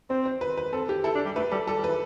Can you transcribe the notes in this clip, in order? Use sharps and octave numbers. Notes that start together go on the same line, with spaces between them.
C4 C5
C5
B4
B4
C4 A4
G4
E4 A4
D4
G3
A3 B4
G3 A4
G3 A4
G3
E3 B4